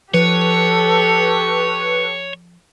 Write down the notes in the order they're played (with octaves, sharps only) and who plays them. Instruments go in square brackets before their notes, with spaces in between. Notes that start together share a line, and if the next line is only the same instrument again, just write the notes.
[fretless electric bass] F3 [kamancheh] G4 A4 [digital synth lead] B4 [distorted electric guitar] C#5